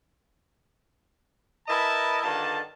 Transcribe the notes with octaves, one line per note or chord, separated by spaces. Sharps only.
E4 A#4 B4 D#5 E5 A5
G2 D3 D#3 F4 A5